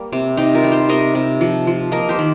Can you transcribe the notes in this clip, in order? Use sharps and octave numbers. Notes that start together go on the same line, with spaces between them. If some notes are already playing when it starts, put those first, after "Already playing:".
Already playing: G3 A#3
C3
C3 D#4 G4
F4 A#4
G3
G4 C5
C3 A#4 D#5
C3
F3
F3
A#3 A#4 D#5
G4 C5
D#3